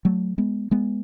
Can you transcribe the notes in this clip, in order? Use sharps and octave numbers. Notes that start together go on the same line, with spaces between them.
F#3 A3
G#3 B3
G#3 B3